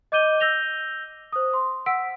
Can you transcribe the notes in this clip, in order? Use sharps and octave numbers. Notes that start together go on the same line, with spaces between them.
D#5 D6 G6 D#7 G7
E6 G6 A#6 F7 G7
C5 D#6
C6
F#5 E6 B6 D7